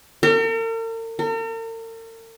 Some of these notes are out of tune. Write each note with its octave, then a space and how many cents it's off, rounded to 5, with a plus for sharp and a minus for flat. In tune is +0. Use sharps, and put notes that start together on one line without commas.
A#4 -45
A#4 -45